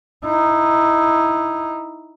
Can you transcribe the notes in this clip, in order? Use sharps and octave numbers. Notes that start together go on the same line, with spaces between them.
D#4 E4